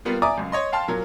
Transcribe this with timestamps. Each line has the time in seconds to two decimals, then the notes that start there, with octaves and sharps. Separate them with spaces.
0.05 G3 A#3 B3 F4
0.22 D5 E5 G#5 A#5 D6 D#6
0.38 C#2 F#2
0.52 C#5 D#5 C6
0.72 F5 G5 A5 C6 F6
0.88 A#2 F#3 A#4